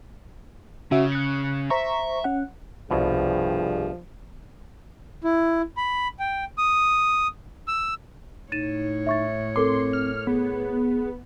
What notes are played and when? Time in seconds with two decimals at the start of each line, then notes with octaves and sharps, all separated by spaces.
0.91 C#3 C#4 F#4 E5
1.12 F#6 C#7
1.70 C5 E5 A#5 C#6
2.24 C#4 F#5
2.91 C2 G2 B2 F3 G4 G#4
5.24 E4
5.77 B5
6.20 G5
6.58 D#6
7.68 E6
8.52 A2 D#4 C#5 A6 D#7 E7
9.07 E5 C#6 A6
9.56 C4 A4 A#4 C6 D6
9.93 F6
10.27 B3 G#4